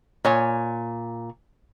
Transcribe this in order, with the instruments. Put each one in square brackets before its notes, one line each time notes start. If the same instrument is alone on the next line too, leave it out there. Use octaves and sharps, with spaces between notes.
[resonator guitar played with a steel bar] A#2 C#5 G#5